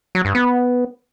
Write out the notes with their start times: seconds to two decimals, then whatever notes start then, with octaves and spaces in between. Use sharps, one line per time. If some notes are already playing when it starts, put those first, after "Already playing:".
0.15 F#3
0.25 G2
0.35 B3